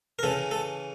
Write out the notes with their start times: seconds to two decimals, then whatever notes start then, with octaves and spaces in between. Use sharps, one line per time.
0.19 A#4
0.23 C#3 E3 A4
0.51 A4